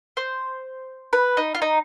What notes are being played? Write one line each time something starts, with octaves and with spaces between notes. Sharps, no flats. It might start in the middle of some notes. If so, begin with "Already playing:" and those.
C5
B4
D#4
F4
D#4